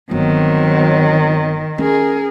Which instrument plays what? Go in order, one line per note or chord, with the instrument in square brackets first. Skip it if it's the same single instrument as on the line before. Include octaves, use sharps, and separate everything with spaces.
[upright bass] G1 [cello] D#3 [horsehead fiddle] F#3 C4
[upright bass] C#4 [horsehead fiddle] G#4 A#4